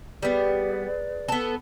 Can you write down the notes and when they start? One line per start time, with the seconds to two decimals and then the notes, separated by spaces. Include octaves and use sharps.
0.23 G3 B3 G#4 B4 D5
1.28 B3 A4